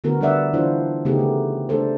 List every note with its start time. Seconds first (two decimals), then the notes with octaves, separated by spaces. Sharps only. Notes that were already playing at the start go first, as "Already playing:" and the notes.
0.04 D3 A3 B3 F#4 A#4
0.21 G3 D4 B4 D5 E5 F#5
0.53 E3 D4 F4 C5
1.05 C#3 A3 B3 D#4 G4 G#4
1.19 A3
1.69 A3 D4 A4 C5